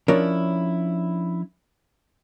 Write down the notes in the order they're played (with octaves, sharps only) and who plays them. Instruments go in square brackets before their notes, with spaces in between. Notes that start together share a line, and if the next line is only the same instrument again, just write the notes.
[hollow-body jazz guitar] F3 C#4 D4 E4 A#4 C#5